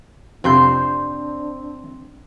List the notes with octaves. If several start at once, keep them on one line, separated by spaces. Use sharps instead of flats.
F2 C3 C4 D4 C6 G6